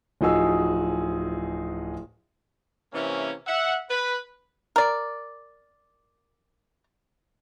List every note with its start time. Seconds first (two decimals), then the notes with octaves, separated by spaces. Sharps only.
0.21 D1 F3 D#4 F#4 G#4 E6
2.93 C3 E3 A#3 C#4
3.46 E5 F#5
3.89 B4
4.76 A#4 D5